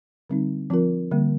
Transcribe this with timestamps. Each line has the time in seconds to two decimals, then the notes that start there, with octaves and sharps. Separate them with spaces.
0.30 D3 G3 C4 D#4
0.70 F3 C4 F4 A#4
1.11 D3 G3 A#3